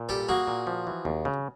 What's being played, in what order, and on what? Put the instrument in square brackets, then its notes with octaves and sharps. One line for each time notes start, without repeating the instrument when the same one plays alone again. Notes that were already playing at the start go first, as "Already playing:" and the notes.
Already playing: [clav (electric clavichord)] A#2
[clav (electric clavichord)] G3 [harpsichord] G4 A4
[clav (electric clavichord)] A#3 [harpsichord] F#4 G#4
[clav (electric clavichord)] A#2
F3
E3
D#2
C#3